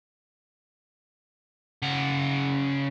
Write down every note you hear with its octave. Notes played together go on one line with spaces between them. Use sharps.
C#3 F#5